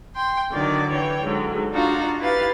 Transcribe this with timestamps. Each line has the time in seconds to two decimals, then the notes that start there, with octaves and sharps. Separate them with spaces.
0.15 G5 C6
0.52 D3 D#3 F#3 D5
0.90 E3 C#5 G5
1.24 G#2 D3 F#3
1.72 D4 D#4 F4 F#4 F5
2.19 E4 G4 B4 F5 A6